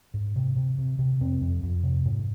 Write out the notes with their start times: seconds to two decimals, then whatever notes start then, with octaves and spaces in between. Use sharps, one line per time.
0.14 G#2
0.36 C3
0.56 C3
0.78 C3
0.99 C3
1.20 F2 C4
1.41 F2
1.63 F2
1.84 C3
2.05 G#2